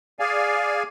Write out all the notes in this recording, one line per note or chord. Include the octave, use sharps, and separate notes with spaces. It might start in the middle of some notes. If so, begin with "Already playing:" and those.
G#4 D5 F5 G#5